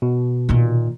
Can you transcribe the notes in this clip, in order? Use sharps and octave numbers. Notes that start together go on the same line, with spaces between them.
B2
A#2 D#3